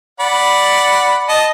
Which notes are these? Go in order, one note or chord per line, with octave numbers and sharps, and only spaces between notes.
D5 F#5 B5
D#5 A5